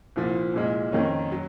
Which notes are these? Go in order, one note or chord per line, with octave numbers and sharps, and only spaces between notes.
C2 A#2 F3
C2 A#2 G#3
F2 D#3 A#3 C#4
F#3